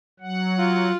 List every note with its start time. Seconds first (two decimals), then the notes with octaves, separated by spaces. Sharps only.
0.20 F#3 F#5
0.59 F4